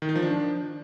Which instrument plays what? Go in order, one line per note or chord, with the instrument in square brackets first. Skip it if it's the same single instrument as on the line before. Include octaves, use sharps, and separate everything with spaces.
[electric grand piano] D#3
D#4
F3
D4